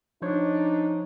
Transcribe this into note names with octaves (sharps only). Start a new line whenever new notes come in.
F3 D4 D#4 C5 C#5